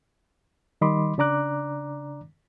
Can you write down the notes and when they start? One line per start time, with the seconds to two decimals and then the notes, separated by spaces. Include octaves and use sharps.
0.81 D#3 G3 D#5 B5 C6 D6
1.18 C#3 D4 D5 A#5 D6 F#6